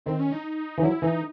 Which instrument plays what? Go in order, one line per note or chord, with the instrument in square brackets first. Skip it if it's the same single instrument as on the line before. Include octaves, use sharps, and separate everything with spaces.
[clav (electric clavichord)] D#3 [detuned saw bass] C4
[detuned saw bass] C#4
D#4
[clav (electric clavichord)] E3
[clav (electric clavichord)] F#3 [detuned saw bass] E4
[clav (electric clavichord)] E3 [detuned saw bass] D#4